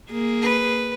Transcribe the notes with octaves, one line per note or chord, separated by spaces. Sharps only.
A#3 G#4
B4